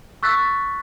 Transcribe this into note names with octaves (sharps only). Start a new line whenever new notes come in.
C#6 E6 F#6 A6 B6